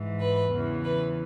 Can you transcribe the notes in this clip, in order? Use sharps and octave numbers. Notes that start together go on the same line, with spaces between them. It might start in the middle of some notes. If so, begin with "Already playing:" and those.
Already playing: G#2 E3
B4
E2 C#3 E3
B4